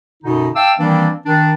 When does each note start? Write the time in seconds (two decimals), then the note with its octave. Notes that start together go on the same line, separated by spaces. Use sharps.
0.23 F#2 B2 D3 D#4
0.56 E5 F5 G5 A5 D6 E6
0.79 D#3 E3 G3 A#3 C4 D4
1.25 D#3 D4